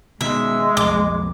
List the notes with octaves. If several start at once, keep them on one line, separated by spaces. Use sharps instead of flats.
B2 D#3 G#3 E5
B1 F2 D6